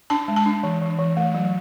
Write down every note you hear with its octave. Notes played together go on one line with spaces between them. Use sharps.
D4 A5
G#3
A5
D4
E3
E3
E3
A3
F#3